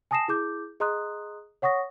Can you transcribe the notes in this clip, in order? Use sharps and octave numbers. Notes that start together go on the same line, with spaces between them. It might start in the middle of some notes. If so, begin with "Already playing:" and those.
G#5 A5 D#6 A#6 C7 E7
E4 G#4 D6 G6
G#4 D#5 A#5 C6 D#6 F#6
C#5 F#5 C#6 D#6 A#6